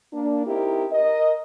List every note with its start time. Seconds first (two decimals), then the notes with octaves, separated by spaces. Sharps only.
0.13 A#3 D4
0.46 C4 D#4 E4 G4 A#4
0.92 A#4 D#5